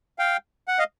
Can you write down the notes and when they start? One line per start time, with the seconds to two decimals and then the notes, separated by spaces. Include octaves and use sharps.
0.19 F5 G5
0.68 F#5
0.79 D#5 F5